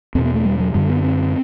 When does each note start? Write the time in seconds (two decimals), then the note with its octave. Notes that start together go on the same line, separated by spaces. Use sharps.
0.15 E2 B2 C4
0.25 B3
0.34 A3
0.45 G3
0.60 F#3
0.74 F#2 D3 G3
0.89 B3
1.04 C4